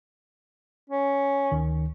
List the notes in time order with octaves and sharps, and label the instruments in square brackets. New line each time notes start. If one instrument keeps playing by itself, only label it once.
[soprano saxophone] C#4
[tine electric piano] D2 D#3